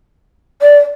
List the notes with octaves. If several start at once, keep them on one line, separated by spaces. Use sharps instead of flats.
D5